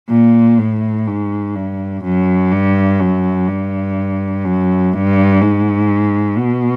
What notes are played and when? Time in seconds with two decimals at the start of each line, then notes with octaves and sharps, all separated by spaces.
0.10 A#2
0.59 A2
1.07 G#2
1.55 G2
2.04 F#2
2.51 G2
3.00 F#2
3.48 G2
4.45 F#2
4.94 G2
5.41 G#2
6.38 B2